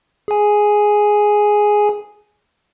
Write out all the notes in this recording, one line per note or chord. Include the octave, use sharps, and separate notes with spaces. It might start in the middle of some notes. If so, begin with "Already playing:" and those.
G#4 G#5